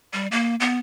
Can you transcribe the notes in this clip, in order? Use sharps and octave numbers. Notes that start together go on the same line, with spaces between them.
G3
A#3
B3